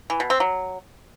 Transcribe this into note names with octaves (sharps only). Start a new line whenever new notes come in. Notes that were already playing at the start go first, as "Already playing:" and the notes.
E3
B2
C4
F#3